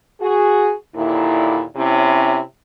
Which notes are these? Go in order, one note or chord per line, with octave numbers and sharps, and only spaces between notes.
F#4 G#4
D#2 A#2 D3 E4
C3 C#4 E4